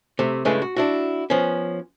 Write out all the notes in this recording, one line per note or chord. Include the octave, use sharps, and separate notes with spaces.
C3 A3
G2 C#3 G#3 A3 E4 B4
F#4
D4 E4 F#4
F3 B3 C#4